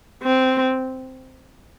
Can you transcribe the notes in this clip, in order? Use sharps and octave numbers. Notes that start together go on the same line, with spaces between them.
C4